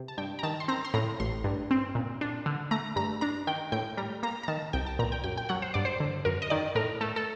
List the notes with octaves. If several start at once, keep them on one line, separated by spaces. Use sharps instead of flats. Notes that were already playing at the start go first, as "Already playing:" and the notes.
Already playing: C3
A5
G2 G5
A#5
D#3 A5
C6
C4 A#5
C6
A2 A#5
A1 C6
G2
C4
A#2
D4
D3
A3 A#5
G2 A#5
D4 A#5
D#3 G5
A2 G5
G3 A#5
A#3 A#5
A#5
D#3 A5
C2 G5
A5
A#2 A#5
G5
F#2 G5
G5
F#3 F#5
C5
G2 D5
C5
D3
F#2 A#4
D#5
D#3 D5
A2 A#4
A3 A4
A4